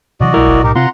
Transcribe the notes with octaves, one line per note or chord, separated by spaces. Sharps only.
C3 E3 F#3 F#4 D5 D#5
B1 G#3 E4 A#4
F#1
A2 D#4 G4 A#4
C3 C4 F4 F#5 A#5 C6